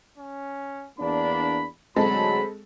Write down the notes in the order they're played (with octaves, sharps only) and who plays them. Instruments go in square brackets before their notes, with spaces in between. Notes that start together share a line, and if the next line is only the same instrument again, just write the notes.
[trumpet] C#4
[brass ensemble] E2 A#3 D4 [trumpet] B5
[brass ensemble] D2 G#2 F#3 [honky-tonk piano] G#3 C4 A4 [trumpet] B5